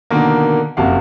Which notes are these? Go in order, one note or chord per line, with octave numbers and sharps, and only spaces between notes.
B2 D3 D#3 A#3
F#1 F2 C3 F#4 F5